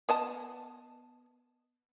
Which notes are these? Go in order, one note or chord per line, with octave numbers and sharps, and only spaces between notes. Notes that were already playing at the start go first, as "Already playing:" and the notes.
B3 D#5 A5